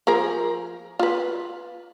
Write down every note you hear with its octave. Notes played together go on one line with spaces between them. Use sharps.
F3 G#4 A#4
F4 B4